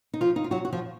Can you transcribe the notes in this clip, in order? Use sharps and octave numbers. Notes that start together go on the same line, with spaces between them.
D#4
F3 F4
D#4
F4
F#3 F#4
F#4
F3 F4